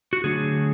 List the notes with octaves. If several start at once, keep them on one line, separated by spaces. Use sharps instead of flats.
F#4
D3 F#3 A3 D4 G#4